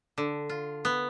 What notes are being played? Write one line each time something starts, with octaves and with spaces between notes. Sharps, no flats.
D3
F4
B3